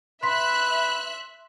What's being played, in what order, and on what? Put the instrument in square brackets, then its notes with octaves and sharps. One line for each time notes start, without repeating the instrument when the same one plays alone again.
[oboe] B4 [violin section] E5 F#6 [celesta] C6 B6